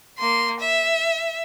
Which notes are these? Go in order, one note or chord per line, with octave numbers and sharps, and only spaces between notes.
A#3 C6
E5